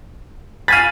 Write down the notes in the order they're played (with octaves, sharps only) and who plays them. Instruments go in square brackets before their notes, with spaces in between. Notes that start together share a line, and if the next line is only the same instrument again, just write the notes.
[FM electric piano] F5 G#5 B5 [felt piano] A6 D#7